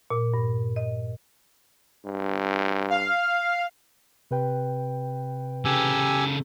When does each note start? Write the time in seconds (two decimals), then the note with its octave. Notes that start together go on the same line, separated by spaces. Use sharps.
0.10 A#2
0.34 G2
0.76 D#5
2.05 G2
2.90 F5
4.31 C3 B4 G5
5.65 C#3 G4 A4 G#5 E6